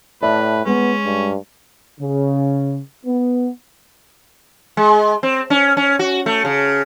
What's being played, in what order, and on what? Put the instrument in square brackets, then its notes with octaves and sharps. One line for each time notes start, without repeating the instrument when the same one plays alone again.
[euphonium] A2 [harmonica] B4 [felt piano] D5 E5 A5
[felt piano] G#3 [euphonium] B3 [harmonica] C#4
[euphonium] G2
[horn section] C#3
B3
[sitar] G#3
C4
C#4
C#4
F#4
A3
C#3